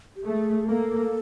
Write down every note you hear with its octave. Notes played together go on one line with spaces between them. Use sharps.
G4
A3 G#4
A#3 A4